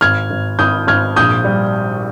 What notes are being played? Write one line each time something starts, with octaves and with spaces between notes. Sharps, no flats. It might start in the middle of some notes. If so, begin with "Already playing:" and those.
G#1 F6 G#6
G#1
G#1 D#6 G6
G#1 F6 G#6
A#1 D#6 G6
G3